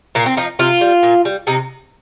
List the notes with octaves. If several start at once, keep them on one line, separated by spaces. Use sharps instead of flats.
A#2 A#3
C4
F3 D#4
C3 F4
G3
A#2
G3
C3 D#4